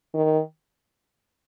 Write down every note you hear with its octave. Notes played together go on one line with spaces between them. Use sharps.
D#3